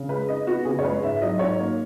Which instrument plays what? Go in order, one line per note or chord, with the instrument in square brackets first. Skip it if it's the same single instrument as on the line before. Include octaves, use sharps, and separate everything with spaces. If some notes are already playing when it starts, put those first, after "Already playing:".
Already playing: [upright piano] C#3
G#3 B4
D#4 D#5
B3 F#4
C#3 G#4
C#5
G#3 B4
G#2 E5
F#3 D#5
G#2 C#5
A#3